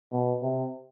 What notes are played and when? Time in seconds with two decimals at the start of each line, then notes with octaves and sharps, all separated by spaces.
0.11 B2
0.42 C3